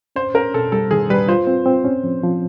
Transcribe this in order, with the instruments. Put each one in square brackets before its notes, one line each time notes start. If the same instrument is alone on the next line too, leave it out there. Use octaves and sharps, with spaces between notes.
[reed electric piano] C#4 [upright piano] C5
[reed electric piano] C#4 [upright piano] A#4
[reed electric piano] B2 [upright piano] A4
[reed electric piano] G3 [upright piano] A4
[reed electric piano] D#3 [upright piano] G#4
[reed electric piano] G3 [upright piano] B4
[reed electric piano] F4 [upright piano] C5
[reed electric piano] C4
C4
C#4
F3
F3